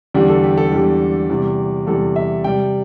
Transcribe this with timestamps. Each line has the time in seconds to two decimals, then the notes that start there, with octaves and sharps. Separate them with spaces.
0.14 E2 D3 G3 G4
0.29 A4
0.44 G4
0.57 A4
0.72 E2 D3 G3 G4
1.30 E2 C3 G3
1.87 E2 C3 G3 A4
2.16 E5
2.44 C3 G3 G5